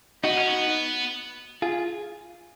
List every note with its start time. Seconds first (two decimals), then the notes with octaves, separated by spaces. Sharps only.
0.24 B3 D#4 F#4
0.36 C#4
0.48 B3
1.62 F4 G#4